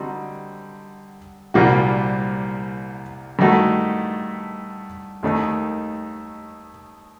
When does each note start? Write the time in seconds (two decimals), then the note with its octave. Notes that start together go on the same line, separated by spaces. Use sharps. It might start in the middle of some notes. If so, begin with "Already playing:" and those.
Already playing: D3 G3 C4 D#4 F#4
1.54 C2 A#2 G3 A#3 F#4
3.39 G2 D#3 A3 D#4 F#4
5.23 D#2 D#3 A3 D#4